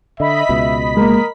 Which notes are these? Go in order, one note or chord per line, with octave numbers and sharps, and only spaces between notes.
D3 D#5 E5 B5 B6
C#2 B2
G#3 A#3 A#4